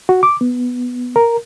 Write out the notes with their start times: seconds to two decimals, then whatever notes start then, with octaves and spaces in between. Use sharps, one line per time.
0.09 F#4
0.23 D6
0.41 B3
1.16 A#4